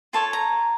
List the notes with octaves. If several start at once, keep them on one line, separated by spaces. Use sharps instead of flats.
F4 A4 C#5 A5
A#5